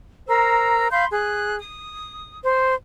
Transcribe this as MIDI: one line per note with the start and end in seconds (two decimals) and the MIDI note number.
0.27 0.87 70
0.27 0.87 72
0.27 0.87 82
0.27 0.87 88
0.91 1.06 77
0.91 1.06 83
0.91 1.06 84
0.91 1.06 91
1.12 1.58 68
1.12 1.58 90
1.60 2.39 87
2.42 2.75 72